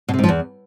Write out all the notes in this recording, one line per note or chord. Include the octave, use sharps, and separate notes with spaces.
B2
C3
G#2
F3
E2